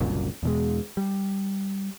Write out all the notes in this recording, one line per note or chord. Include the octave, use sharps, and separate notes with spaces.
F#1 C2 F#2 A#2
E2 B2 G#3
G3